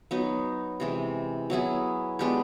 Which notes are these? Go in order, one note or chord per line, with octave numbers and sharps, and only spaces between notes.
F#3 B3 D#4
C3 E3 G#3
F#3 B3 E4 G#4
G#3 B3 D4 G4